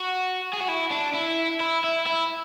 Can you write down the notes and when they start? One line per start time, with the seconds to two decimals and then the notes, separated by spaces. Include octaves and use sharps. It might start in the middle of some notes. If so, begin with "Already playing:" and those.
Already playing: F#4
0.53 G#4
0.60 F#4
0.68 E4
0.91 D4
1.14 E4
1.60 E4
1.84 E4
2.07 E4